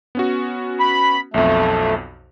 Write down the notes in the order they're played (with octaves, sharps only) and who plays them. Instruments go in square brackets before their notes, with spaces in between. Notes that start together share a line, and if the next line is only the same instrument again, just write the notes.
[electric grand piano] B3 C#4 F#4
[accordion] B5
[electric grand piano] B1 F2 [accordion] A3